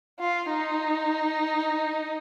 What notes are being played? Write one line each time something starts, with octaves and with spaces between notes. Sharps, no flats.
F4
D#4